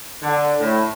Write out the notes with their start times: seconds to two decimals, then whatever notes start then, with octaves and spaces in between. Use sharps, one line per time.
0.22 D3
0.60 A2